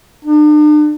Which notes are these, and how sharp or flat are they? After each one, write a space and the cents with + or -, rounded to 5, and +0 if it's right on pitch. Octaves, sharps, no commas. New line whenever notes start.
D4 +40